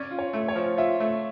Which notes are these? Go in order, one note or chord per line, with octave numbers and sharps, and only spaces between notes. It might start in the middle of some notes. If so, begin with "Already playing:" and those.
Already playing: C#4 D5
F4
C#5
A3
C#5
F3
F4 E5
A3